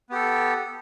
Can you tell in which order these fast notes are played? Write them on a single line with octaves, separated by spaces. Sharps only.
B3 G4 A4